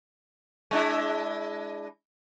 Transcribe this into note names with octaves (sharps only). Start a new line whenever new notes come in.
G#3 D4 E4